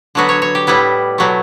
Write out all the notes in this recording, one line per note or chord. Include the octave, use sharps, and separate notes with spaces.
D3 F#3 B3 F#4
C#5
C#5
G4
A2 G3 B3 E4
B2 F#3 A3